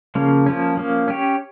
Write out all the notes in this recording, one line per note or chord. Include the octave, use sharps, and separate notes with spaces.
C#3 F3 A#3 C#4
F3 A#3 C#4
F3 A#3 C#4
C#4 G4 C#5